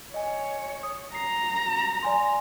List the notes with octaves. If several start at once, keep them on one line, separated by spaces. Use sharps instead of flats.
C#5 D#5 G#5
D#6
A#5 C7
D5 G#5 C6